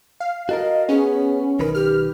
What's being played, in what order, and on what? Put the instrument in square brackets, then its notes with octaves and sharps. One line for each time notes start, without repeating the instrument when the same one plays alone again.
[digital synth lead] F5
[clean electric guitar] F#4 A4 A#4 [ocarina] D#5
[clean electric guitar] B3 [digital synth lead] C#4 [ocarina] G#4
[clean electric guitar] B1 D#3 B4 [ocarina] A#4
[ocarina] G4 [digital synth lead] F6